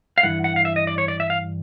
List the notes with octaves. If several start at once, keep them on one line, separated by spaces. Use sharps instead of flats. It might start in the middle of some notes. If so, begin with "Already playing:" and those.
F5
G2 E3 F#5
F#5
F5
E5
D#5
D5
C#5
D5
E5
F5